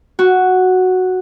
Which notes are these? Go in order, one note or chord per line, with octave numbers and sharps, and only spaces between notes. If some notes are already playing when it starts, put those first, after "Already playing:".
F#4